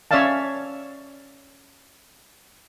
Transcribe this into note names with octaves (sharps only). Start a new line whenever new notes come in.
C#4 C#5 D5 E5 F5 A5